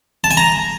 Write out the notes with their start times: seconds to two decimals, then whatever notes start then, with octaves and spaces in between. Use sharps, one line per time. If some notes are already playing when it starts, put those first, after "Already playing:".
0.24 A5
0.31 G#5
0.37 A#5